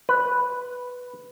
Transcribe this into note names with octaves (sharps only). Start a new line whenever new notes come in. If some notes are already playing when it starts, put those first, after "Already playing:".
B4